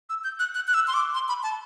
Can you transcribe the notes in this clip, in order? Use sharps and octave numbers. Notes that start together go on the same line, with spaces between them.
E6
G6
F#6
F#6
F#6
E6
C6
D6
C6
B5
A5